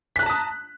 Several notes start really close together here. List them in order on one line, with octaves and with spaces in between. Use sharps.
B6 F#6 A#5 A5 D#6